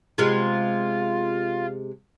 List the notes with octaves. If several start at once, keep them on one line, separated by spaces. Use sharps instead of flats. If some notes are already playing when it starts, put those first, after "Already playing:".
C3 G#3 B3 F4